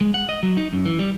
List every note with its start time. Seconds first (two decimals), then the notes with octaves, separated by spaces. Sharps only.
0.01 G#3
0.14 F#5
0.29 D#5
0.43 F#3
0.57 D#4
0.73 F#2
0.86 E3
0.99 G3